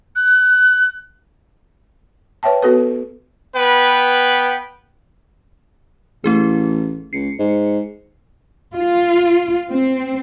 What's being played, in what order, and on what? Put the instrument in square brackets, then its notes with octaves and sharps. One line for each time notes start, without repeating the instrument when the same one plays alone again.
[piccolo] F#6
[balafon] B4 C#5 E5 G5 A5
B3 F#4 A4 B4
[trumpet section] B3 B4 G5
[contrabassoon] A1 [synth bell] A3 E4 G#4
[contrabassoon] C#2 [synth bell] C7 C#7
[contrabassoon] G#2
[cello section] F4
C4